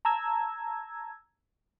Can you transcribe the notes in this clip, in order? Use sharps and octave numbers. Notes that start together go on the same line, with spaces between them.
A5 A#5 E6 G#6